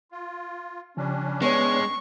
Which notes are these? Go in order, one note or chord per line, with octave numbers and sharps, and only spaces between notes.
F4
C#3 F3 G3 C#4 D4
G#3 B3 C#5 C#6